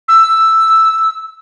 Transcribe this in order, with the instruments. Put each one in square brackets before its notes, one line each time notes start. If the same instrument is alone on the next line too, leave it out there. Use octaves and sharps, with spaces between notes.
[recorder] E6